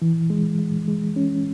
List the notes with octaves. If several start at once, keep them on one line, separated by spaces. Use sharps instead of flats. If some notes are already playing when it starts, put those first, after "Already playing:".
E3
G#3
G#3
G#3
C#4